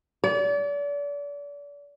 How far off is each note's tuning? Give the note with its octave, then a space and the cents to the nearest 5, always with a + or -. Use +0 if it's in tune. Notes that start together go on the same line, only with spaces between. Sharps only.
D5 -35